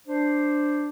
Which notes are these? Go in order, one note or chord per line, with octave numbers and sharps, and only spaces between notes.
D4 C5